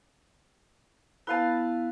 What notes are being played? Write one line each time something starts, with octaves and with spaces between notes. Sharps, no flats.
B3 E4 B4 F5 A5